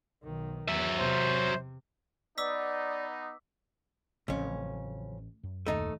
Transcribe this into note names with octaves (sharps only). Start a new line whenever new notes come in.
B1 D#3
E2 F#3 E5
C3 C5
B3 D#4 D5 D6 E6 B6
A1 F2 C#3 F3 F#3 C#4
F#2
A#1 D#2 A3 D#4